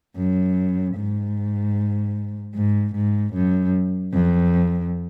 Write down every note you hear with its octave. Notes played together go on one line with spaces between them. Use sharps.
F#2
G#2
G#2
G#2
F#2
F2